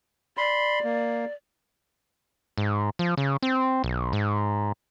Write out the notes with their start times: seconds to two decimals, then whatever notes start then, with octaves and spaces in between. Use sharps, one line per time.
0.37 D5 B5 C6
0.84 A#3
2.58 G#2
2.99 F3
3.17 C#3
3.43 C4
3.84 B1
4.13 G#2